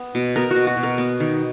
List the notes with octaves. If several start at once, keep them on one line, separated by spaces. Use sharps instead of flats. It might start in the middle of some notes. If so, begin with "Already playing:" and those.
Already playing: B3
B2
B3 A#4
F#4
B2
F#4
B2
A#4
B3
D#3